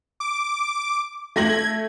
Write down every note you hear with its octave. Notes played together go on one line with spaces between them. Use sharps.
D6
A3 G#6 A#6 F#7